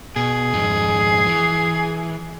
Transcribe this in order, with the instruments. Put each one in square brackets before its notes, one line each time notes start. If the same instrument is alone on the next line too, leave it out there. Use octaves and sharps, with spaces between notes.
[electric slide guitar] B2 [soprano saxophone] G#4
[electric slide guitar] F2 G#2 D#4
E3